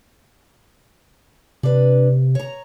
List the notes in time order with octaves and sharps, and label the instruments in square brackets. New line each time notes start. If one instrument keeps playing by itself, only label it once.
[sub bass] C3 [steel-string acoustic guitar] D4 B4
[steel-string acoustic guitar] C#5 A#5